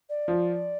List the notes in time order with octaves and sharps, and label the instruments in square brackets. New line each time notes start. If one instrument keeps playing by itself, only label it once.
[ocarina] D5
[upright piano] F3